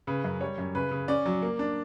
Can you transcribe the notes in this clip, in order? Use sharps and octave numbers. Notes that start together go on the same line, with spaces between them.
C#3 B4
F#2
G3 C#5
F#2
C#3 B4
C#3
C#4 D5
F#3
A#3
D4